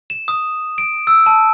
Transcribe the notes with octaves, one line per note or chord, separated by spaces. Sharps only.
E7
D#6
D7
E6
A5